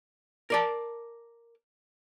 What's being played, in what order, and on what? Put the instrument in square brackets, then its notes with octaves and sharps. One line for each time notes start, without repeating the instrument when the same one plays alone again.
[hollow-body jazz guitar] A#4 D5 A5